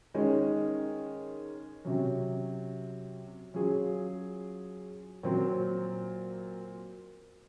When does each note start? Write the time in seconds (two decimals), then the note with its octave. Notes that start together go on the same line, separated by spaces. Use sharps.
0.14 D#3 G#3 C#4
1.85 C3 F#3 C#4
3.54 F#3 C#4 F4 G#4
5.23 A#2 F#3 C4